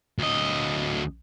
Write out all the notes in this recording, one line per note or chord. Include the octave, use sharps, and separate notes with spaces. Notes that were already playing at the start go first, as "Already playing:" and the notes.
D2 D#5